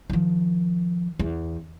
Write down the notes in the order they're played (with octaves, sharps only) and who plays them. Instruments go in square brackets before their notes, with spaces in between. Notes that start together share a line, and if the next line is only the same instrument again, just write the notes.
[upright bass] D#3 F3
E2